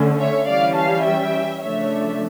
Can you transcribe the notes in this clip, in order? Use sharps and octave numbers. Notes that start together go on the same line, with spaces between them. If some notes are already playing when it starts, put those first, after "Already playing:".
Already playing: D3 A3 C#4
C#5 E5
E3 G3 C#4 D5 F5
F5 A5
E5 G5
C#3 F3 A3 D4 C#5 E5